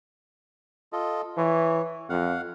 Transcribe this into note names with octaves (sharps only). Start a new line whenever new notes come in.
F4 A4 D#5
E3 C#5
F2 F5 F#5